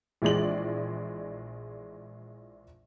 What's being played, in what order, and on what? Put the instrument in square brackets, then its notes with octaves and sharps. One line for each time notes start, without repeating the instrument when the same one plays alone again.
[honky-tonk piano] A#1 E3 G#3 D5 F#7